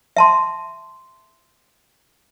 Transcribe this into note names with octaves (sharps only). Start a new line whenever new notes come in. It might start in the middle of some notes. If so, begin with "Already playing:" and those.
E5 A5 C6